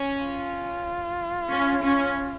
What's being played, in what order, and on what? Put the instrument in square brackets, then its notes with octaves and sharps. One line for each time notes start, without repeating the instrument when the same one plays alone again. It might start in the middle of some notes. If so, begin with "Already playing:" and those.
Already playing: [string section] C#4
[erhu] F4
[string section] C#4
C#4